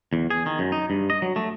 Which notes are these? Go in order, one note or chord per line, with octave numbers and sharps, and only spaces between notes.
E2
G#4
D#3
F#2
D#4
G2
D#5
F#3
A3